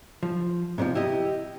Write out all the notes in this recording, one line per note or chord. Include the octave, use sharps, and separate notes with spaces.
F3
G#2 C3 D#3 F3
E4 G4 D#5